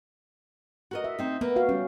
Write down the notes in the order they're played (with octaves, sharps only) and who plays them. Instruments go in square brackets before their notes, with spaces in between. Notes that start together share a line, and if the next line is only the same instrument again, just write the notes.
[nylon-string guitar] F#4 A#4 D#5
[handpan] E5
[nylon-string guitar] C4 D#4
[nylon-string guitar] A#3 A#4 B4 [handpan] B3
[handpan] F#4 F5
[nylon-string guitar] G3 [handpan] C#4